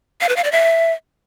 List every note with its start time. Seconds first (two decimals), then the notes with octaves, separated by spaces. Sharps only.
0.21 F5
0.29 B4
0.36 F5
0.44 D5
0.52 E5